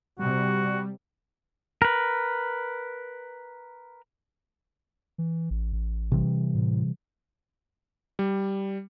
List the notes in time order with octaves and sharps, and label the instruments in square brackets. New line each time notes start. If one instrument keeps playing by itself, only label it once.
[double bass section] C3 C4 [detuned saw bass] G3 [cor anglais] F#4
[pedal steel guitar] A#4 B4
[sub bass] E3
A1
A1
[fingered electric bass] C3 E3 G3
[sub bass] A2
[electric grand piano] G3